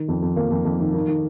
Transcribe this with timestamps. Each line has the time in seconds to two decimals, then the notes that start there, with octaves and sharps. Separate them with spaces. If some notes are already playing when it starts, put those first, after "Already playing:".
Already playing: D#3
0.08 F2
0.22 F2
0.36 F2 A#3
0.51 F2
0.65 F2
0.79 D#3
0.94 D#3
1.08 D#3